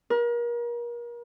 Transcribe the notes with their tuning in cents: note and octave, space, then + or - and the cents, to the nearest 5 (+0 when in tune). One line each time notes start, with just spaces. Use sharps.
A#4 +35